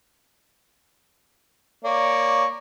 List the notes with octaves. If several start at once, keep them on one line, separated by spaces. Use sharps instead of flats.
A#3 C#5 D5